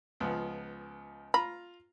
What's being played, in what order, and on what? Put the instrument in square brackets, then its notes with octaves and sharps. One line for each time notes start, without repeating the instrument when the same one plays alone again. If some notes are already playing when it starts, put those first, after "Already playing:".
[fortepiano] C#2 F3 B3
[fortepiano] F4 A#5 [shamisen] B5